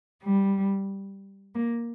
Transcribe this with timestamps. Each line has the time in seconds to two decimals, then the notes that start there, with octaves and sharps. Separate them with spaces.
0.22 G3
1.54 A#3